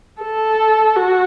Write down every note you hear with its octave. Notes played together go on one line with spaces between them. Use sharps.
A4
F#4